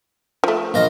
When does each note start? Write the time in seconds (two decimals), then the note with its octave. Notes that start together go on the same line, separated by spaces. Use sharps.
0.44 F3 A3
0.74 A#1 F4 D#5 A#5